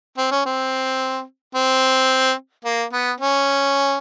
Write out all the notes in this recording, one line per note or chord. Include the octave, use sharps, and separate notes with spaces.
C4
C#4
C4
C4
A#3
B3
C#4